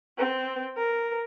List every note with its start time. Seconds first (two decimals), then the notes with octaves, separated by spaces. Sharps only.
0.18 C4
0.76 A#4